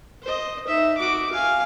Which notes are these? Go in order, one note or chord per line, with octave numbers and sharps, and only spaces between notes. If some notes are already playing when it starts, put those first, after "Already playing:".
C5 D#5
D#4 E5
F#4 D6
F5 G#5